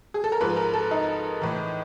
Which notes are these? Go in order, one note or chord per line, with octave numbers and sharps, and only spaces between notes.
G#4
A4
A#4
G#2 F3 B4
A#4
A4
D#4
A2 E3